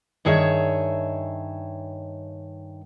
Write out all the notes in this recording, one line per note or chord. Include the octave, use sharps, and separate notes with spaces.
G2 D#3 G#4 C#5 E5